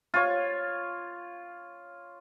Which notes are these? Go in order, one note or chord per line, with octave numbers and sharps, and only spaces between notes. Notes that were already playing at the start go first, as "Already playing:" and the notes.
F4 C#5